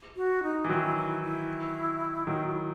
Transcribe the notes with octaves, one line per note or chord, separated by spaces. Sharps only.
F#4
D#4
E3
D#3 F#3 E4 F#4
E4
E4
D#3 F#3 D#4
F#4
E4